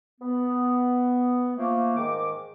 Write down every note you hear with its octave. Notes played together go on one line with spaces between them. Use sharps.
B3
F3 A3 A#3
G#2 D#3 D6